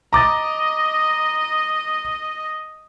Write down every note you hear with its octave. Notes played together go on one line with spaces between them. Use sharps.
D#5 A#5 D6 A6